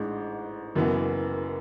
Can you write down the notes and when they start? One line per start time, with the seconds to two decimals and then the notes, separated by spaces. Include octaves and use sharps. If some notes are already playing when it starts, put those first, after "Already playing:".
Already playing: A1 G#2 G#3 D4
0.75 F#1 F#2 E3 B3